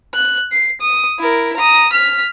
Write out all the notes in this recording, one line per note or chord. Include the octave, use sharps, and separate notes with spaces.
F#6
C7
D#6
E4 A#4
A#5 D#6
F6 B6